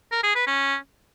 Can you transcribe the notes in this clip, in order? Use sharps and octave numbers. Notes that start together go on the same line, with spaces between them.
A#4
G#4
B4
C#4